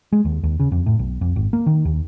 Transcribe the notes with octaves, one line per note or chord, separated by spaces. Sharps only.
G#3
D#2
D#2
C#3
F2
A2
B1
F2
G#1
A#3
D#3
D#2